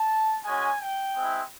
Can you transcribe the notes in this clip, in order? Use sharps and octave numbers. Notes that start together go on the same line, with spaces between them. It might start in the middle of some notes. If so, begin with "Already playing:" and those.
Already playing: A5
G#3 C#4 F#4 G#5
G5
G#3 C4 E4